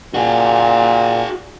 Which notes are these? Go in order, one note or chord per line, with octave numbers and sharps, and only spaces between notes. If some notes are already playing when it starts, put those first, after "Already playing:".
A#2 F#4 G#4